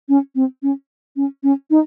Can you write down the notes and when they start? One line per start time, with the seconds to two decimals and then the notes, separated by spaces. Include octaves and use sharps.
0.09 C#4
0.35 C4
0.63 C#4
1.16 C#4
1.43 C#4
1.70 D#4